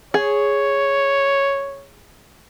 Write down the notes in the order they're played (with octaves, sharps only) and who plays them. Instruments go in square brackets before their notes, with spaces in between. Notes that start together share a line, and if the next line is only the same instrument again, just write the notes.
[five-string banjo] G#4 [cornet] C#5